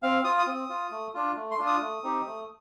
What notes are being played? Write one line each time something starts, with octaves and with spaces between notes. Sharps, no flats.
C4 F5
F4 D#6
D#6
C4
F4
A3
D4 F4
A3
C6
D4 F4
D#6
A3
C4 D#4 G4
A3